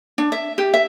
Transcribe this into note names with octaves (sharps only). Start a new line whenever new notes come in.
D4
E5
G4
E5